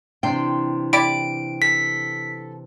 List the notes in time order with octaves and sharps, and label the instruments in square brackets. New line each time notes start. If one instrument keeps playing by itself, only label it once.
[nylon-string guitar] C3 E3 D4 [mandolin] G5 C6
[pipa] E4 G4 D5 [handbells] D7
[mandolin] A4 [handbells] B6